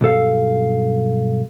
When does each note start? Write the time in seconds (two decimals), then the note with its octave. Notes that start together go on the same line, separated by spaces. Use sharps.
0.01 B1 G2 A4 F5